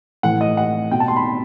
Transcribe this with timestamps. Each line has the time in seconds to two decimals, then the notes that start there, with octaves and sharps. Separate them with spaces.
0.23 A2 E3 F#5
0.41 D#5
0.57 F#5
0.91 B2 G5
1.00 A5
1.08 C6
1.16 B5